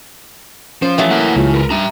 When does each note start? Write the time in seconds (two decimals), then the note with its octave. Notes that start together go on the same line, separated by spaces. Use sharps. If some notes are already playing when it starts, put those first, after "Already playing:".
0.82 F3 C#4 C5
0.98 E3 F#3 A3
1.11 C2 A#3 A#4 F#5
1.36 C#2 C#3 G#3 F4
1.54 A#4 B4
1.71 G3 D4 E5 A#5